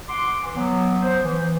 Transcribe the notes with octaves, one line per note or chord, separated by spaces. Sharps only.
F#5 C6 D6
E3
F#3 B3
C5
E3